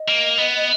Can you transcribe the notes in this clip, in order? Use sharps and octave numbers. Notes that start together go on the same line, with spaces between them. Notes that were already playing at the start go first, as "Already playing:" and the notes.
Already playing: D#5
A#3
B3